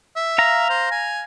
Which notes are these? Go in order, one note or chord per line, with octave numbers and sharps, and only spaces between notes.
E5
F5 A#5
C5
G#5